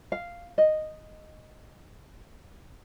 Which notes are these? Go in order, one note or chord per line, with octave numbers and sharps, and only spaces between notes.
F5
D#5